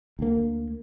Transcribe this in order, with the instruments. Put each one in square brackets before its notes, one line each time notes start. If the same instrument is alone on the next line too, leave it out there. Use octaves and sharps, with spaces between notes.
[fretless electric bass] D2 A#3